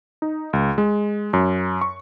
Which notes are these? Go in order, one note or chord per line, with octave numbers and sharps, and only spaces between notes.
D#4
C#2
G#3
F#2
C#6